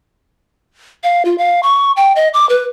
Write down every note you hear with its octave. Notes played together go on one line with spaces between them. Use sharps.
F5
F4
F5
C#6
G5
D#5
D6
B4